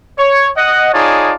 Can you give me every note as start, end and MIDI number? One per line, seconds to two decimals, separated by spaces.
0.19 0.49 73
0.57 0.90 75
0.57 0.90 78
0.93 1.33 63
0.93 1.33 65
0.93 1.33 68
0.93 1.33 73
0.93 1.33 74
0.93 1.33 81